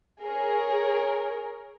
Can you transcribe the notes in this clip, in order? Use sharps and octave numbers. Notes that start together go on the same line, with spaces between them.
G#4 A#4 C#5